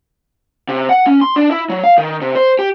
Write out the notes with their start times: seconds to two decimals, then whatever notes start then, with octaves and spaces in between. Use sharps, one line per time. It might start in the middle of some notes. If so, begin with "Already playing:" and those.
0.69 C3
0.89 F#5
1.06 C#4
1.21 C6
1.36 D4
1.51 E4
1.69 F#3
1.84 F5
1.98 D#3
2.21 C3
2.35 C5
2.59 G4